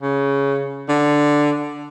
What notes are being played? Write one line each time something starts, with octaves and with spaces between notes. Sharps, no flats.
C#3
D3